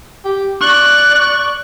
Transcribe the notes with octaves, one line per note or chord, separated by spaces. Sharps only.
G4
D5 C#6 F#6